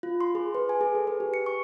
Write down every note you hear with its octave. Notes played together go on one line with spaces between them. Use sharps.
F4
C6
G#4
B4
G#5
G#4
A4
B4
G4
C#7
C#6